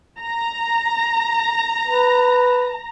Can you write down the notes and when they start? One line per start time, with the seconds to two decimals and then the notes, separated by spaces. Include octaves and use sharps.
0.19 A#5
1.86 B4